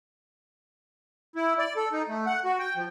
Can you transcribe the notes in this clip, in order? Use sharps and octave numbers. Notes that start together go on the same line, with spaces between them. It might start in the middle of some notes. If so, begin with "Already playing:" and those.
E4
D5
A4
D#4
A3
F#5
F#4
G5
F3